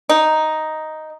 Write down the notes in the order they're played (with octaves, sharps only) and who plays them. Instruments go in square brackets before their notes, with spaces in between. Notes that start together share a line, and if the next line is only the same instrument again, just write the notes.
[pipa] D#4